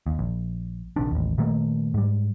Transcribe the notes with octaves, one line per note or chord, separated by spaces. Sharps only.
D#2
A#1
A#1 C3 D#3 D4
A1 D#2
A#2 D#3 A3 A#3
G#2 G3